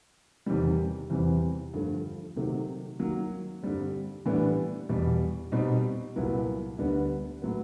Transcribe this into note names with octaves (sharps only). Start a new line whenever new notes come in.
E2 C3 D#3 G3
E2 C3 E3 G3 C4
G2 D3 F3 A3
C3 D#3 F#3 A3
D#3 F#3 A#3
G2 D3 G3 C4
A2 E3 G3 B3 D4
E2 B2 G3
B2 G3 C4 D#4
C2 A#2 F#3 B3 E4
D2 D3 G3 B3 D4
A2 F#3 B3